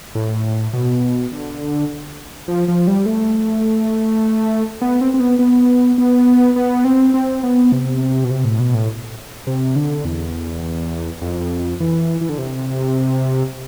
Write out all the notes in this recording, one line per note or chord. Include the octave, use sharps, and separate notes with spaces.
A2
B2
D3
F3
F3
G3
A3
B3
C4
C4
B3
B3
B3
B3
C4
C4
B3
C3
B2
C3
A2
B2
A2
C3
D3
E2
F2
E3
E3
D3
C3